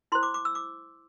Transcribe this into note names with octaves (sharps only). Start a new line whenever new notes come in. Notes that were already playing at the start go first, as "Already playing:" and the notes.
E4 C5 C6
D6
D6
E6
D6